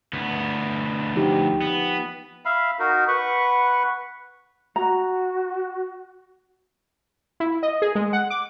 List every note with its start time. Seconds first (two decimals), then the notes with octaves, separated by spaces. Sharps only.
0.13 D2 B3
1.15 F3 D#4 G4
1.61 B3
2.45 E5 F5 B5
2.79 D#4 F#4 A#4
3.08 B4 F#5 B5 C#6
4.76 F#4 A#5
7.40 E4
7.63 D#5
7.82 G#4
7.95 G#3
8.13 F#5
8.30 D6